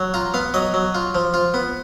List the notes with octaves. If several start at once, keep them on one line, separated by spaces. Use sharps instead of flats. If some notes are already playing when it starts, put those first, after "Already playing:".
Already playing: F#3
F4 A#5
B3 F5
F#3 D#5
F#3
F4
F3
F4
B3